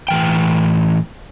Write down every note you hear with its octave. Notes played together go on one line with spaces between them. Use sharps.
A2 E3 G5